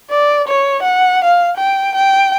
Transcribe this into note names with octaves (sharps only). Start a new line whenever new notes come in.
D5
C#5
F#5
F5
G5
G5